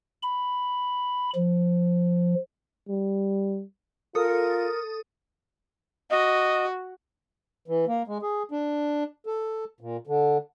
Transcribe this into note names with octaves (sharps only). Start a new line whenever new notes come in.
B5
F3
G3
F4 A4 A#4 D#6
F#4 D#5
E3
A#3
G#3
G#4
D4
A4
A#2
D3